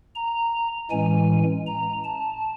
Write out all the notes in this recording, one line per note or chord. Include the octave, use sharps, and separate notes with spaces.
A#5
A2 E3 G#3 C#4 G#5
A#5
A5